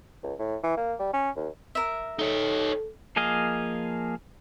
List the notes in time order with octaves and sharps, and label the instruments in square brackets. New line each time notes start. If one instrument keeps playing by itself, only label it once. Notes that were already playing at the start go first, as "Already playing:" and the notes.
[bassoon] C#2
A2
E3
A#3
G3
C#4
D#2
[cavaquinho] A#4 E5
[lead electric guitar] D#4 C#5 [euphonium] A4
[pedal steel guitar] F3 A#3 G#4 D#5 F5